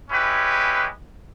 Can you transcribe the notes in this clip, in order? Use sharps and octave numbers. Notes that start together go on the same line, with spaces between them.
G#3 C#4 E4 G4 B4